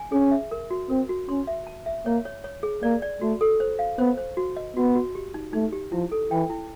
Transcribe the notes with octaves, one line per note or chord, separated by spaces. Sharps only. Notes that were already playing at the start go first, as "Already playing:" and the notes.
Already playing: G#5
C#4 G#4
E5
A#4
F#4
C4 A#4
F#4
C#4 C6
E5
A5
E5
A#3 C#5
C#5
C#5
G#4
A#3 D5
D5
A3 F#4
A4
C5
F5
B3 C5
C5
F#4
D#5
B3 F#4
F#4
G4
D#4
A3 D#4
G4
F3 E4
A4
E3 G5
E4